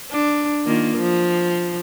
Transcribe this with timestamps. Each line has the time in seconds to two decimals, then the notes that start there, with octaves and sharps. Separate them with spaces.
0.11 D4
0.66 D#3 A#3 F4
0.98 F3